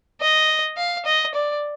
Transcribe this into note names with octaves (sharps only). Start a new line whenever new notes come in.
D#5
F5
D#5
D5